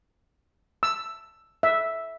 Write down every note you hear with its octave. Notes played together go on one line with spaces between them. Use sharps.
E6
E5